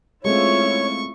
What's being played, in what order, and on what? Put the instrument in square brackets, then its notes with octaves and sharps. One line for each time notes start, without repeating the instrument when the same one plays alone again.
[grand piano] G#3 A3 C4 [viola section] C#4 E4 F4 [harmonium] C#5 [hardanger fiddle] C#6